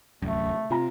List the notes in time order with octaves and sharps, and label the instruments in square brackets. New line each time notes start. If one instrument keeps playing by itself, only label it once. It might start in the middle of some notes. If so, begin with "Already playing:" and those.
[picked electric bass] D1 C2 F#2 [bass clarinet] A3
[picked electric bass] C3 [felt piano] F4 A#5